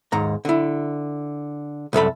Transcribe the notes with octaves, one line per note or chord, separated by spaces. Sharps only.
D#2 G#2 A#5
D3 E4
C2 F#2 A4 B5